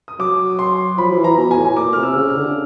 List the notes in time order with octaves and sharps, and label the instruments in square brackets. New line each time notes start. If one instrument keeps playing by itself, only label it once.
[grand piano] D#6
[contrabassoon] F#3 [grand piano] D6
[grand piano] C6
[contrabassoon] F3 [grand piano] B5
[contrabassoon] F3
E3
[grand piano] A#5
[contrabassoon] B2
[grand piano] G#5
[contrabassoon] A2
[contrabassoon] A#2 [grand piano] D6
[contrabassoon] C3 [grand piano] F6
[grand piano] E6
[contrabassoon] C#3
[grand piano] F6
[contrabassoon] D3